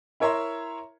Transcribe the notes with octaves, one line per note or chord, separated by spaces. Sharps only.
E4 A#4 C#5 E5 A#5 C6